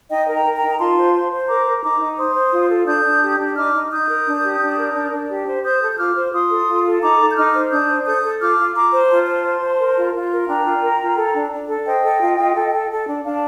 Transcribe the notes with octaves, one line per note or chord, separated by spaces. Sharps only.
D#4 D#5 G5
A#4
G5 A#5
A#4
G5 A#5
D#4
A#5
F4 A5 C6
C5
C5
C5
A#4 A#5 D6
A#4
D#4 A#5 D6
D#4
C5 C6 D#6
C5
F4
A4
D4 D#6 G6
D4
G4
D4
D#4 D6 F6
D#4
D#4 D#6 G6
A#4
D4
G4
D4
A#4
D4
D4
G4
C5
C5 D#6 G6
A4
G6
F4 D6 F6
C5
F4 C6 D#6
A4
F4
A4
D#4 A#5 D6
A4
G6
D#4 D6 F6
C5
D4 D#6 G6
C5
A4 D#6 G6
A4
F4 D6 F6
F4
F4 A#5 D6
C5
F4 A5 C6
C5
C5
C5
A#4
F4
F4
A#4
D4 G5 A#5
F4
A#4
F4
A4
D4
D4
A4
C5 D#5 G5
A4
F4
F4
A4
A4
A4
D4
D4 F5 A5